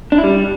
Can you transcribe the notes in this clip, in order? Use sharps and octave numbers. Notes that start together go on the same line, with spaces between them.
D4
E4
G3